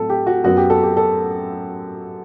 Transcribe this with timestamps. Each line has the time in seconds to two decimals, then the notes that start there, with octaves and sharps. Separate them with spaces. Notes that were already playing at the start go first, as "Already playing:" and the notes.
Already playing: A2 F#3 C4 A4
0.10 G4
0.27 F#4
0.44 F#2 F#3 B3 F#4
0.57 G4
0.70 A4
0.83 G4
0.97 A4